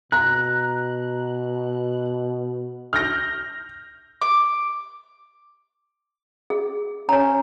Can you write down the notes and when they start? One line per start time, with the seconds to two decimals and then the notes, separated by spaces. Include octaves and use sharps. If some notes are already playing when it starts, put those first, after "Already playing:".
0.12 B2 A#5 F#6
2.93 F6 G6 A#6
4.22 D6
6.50 G#4
7.09 C#4 C#5 A#5